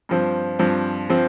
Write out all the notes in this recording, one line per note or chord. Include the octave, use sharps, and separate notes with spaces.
G2 F3 C4
G2 F3 C4
F3 C4